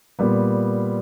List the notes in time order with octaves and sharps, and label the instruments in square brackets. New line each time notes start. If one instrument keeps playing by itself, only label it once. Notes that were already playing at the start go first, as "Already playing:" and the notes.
[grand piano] A#2 G3 B3